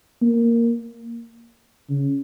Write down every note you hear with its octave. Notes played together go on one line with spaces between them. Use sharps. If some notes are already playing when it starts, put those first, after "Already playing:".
A#3
C#3